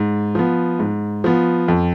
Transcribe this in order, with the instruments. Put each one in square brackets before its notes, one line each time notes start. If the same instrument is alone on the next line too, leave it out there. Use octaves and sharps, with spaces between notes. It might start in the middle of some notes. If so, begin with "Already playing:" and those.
Already playing: [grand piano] G#2
F3 B3
G#2
F3 B3
F2